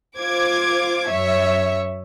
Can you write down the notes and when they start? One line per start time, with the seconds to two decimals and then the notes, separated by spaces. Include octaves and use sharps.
0.18 F4 C5 D6 G#6
1.08 F#2 C#5 E5